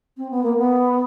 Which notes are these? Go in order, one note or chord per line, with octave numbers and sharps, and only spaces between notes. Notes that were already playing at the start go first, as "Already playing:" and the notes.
C4
B3
A#3
B3